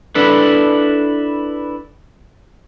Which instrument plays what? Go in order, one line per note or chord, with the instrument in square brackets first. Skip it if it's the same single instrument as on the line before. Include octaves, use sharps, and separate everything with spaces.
[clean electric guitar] D4 E4 A4 B4